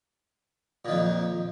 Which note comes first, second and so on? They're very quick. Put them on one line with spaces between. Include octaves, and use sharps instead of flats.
A#2 D#3 F2